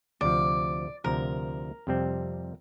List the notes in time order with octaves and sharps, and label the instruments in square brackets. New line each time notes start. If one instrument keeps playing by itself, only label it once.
[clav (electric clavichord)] D2 C3 F3 [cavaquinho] D5
[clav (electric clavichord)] D2 C3 F3 [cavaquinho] A#4
[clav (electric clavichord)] F2 C3 G3 C4